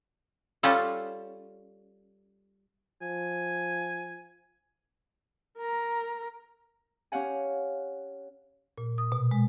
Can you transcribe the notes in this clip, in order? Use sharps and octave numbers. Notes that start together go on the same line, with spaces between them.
G3 C#4 F4 A4
F3 G#5
A#4 A#5
C#4 G4 F5 F#5 G#5
A#2
D#6
B2
G#3